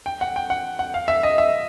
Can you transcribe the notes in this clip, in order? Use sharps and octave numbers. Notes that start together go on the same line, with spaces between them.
G5
F#5
G5
F#5
F#5
F5
E5
D#5
E5